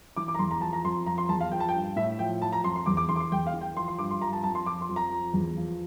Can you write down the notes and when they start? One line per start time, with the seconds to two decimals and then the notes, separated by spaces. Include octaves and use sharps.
0.17 E3 D6
0.28 D6
0.35 A#5
0.39 E2 C6
0.51 A#5
0.61 F3 A5
0.73 A#5
0.84 F2 C6
1.06 F3 A#5
1.18 C6
1.29 E2 A5
1.40 F5
1.52 F3 G5
1.60 A5
1.69 G5
1.75 G2
1.96 A2 E5
2.19 F3 G5
2.42 F3 A5
2.52 A#5
2.63 F2 C6
2.76 C6
2.86 E2 D6
2.97 D6
3.09 E3 C6
3.16 D6
3.20 C6
3.32 E2 G5
3.47 F5
3.53 E3
3.61 G5
3.76 F3 C6
3.88 C6
3.98 G2 D6
4.11 C6
4.22 F3 A#5
4.33 A5
4.43 F2 A5
4.55 C6
4.66 F3 D6
4.81 C6
4.89 F2
4.96 A#5
5.11 F3
5.34 E2
5.57 F3